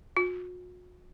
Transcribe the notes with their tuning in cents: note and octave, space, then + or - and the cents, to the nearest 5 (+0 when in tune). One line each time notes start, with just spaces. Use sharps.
F#4 -40